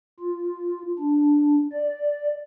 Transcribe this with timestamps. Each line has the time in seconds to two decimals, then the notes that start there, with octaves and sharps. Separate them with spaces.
0.19 F4
0.99 D4
1.72 D5